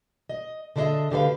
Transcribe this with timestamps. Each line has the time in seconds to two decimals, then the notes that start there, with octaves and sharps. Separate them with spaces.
0.29 D#5
0.76 D3 D4 E4 G#4 D#5 E5
1.10 D2 D3 G4 B4 F5